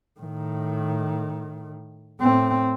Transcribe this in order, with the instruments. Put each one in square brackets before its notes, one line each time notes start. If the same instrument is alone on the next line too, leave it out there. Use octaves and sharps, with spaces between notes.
[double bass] A2 D#3
A2 C4